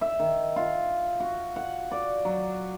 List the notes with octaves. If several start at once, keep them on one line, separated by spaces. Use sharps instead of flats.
E5
D#3
F4
F#4
F#5
D5
F#3